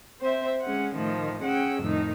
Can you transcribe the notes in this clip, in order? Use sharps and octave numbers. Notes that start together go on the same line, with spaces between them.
C4 C5 E5
G#3 C#4 F#5
A2 D#3 F3 A3
C#4 G#4 F#5 G5 E6
F2 A2 D#3 D#4